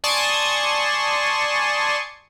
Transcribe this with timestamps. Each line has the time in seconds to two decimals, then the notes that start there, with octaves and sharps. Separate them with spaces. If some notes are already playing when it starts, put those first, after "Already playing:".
0.04 D5 G#5 A5 C6 C#6 D#6